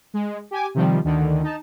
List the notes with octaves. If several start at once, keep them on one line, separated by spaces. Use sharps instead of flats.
G#3
G4 G#5 D6
C3 D#3 F3 G3
D2 D3 D#3
D#4 A5